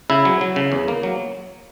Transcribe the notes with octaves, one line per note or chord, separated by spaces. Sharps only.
C#3 E4
F#3
F#3
C#3
E2
A#3
F#3